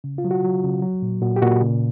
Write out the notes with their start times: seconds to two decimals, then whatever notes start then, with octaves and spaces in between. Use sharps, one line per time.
0.04 C#3
0.18 F4
0.25 F#3
0.31 F#4
0.44 F#3
0.63 C#3
0.82 F#3
1.02 A#2
1.22 A#2 F#4
1.36 G4
1.42 A#2 F#4
1.61 C#3